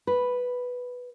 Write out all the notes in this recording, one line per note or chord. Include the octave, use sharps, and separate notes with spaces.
B4